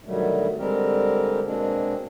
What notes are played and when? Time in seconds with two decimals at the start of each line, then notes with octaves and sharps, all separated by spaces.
0.05 B2 D3 D#3 F#3 G3 A3
0.58 D3 G3 G#3 C4 G4 A#4
1.44 B2 G#3 A#3 C4 D4